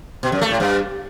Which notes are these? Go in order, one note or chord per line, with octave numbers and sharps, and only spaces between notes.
B2
F#2
A3
A2
G2